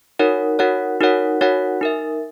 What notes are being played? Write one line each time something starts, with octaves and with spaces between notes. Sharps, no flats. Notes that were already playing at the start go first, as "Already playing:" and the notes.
D#4 F#4 A#4 C#5 F#5
D#4 F#4 A#4 C#5 F#5
D#4 F#4 A#4 C#5 F#5
D#4 F#4 A#4 C#5 F#5
D#4 A#4 E5